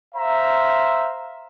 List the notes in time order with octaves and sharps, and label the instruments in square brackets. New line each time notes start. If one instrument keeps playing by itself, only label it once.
[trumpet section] C5 E5 F5 A#5